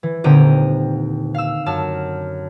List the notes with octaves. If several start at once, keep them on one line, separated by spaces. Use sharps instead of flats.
E3
D#1 D3 C4 G5 A#5 D#7
F5 E6
F#2 A5 E6 F6